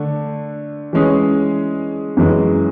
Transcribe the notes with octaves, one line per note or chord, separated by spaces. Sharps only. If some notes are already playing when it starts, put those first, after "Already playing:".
Already playing: D3 A3 D4
E3 G#3 C#4 G#4
F#2 E3 G#3